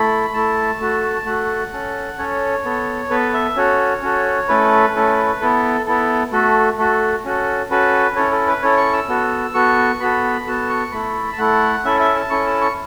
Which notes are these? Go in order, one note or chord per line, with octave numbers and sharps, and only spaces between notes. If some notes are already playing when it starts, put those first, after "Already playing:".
Already playing: A3 E4 A4 B5
A3 E4 A4 A5
A3 F#4 A4
A3 F#4 A4 F#5
C#4 A4
C#4 A4 C#5
B3 A4
B3 A4 B4
E5
C#4 F#4 A4 C#5
C#4 F#4 A4
A3 C#4 E4 A4 B4
A3 C#4 E4 A4
B3 E4 A4
B3 E4 A4
A3 F#4 A4
A3 F#4 A4
C#4 F#4 A4
C#4 F#4 A4 B4
C#4 E4 A4 C#5
A4
B4
C#4 E4 A4 C#5
C#6
E6
B3 F#4 A4
B3 F#4 A4 C#6
B3 F#4 A4 B5
B3 F#4 A4 A5
C#6
A3 E4 A4 B5
A5
A3 E4 A4 F#5
C#4 E4 A4 E5
E5
A5
C#4 E4 A4 C#6
A5
C#6